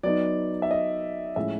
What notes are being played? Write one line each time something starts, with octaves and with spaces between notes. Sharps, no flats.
F#3 B3 D#4 D5
E5
D#5
A2 F3 G#3 C#4 E4 E5